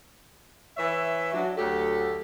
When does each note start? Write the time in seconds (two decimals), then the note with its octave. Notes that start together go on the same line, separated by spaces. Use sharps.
0.77 E3 C#5 E5
1.33 F#3 D4
1.57 D2 F#3 G4 A4